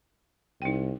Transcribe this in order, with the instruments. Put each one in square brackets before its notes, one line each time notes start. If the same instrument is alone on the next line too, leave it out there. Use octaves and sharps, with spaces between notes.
[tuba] C2 [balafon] D#4 G5